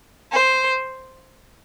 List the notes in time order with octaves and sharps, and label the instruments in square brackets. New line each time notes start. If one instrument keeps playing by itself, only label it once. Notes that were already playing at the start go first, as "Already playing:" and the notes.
[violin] C5